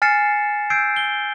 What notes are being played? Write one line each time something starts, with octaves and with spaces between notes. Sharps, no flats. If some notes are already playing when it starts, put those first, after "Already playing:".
G#5 F6 A6 C7 C#7 E7
E6 G6 G#6 C7 D7
G7